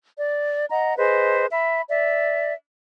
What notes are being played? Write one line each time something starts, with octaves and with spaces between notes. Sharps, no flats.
D5
D#5 F#5 A#5
G#4 B4 C5 D#5
E5 B5
D5 E5